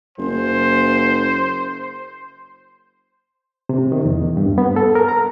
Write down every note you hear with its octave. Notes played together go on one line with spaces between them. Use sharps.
F#1 C5
C3
D#3
E2
G2
B3
A4
A#4
A#5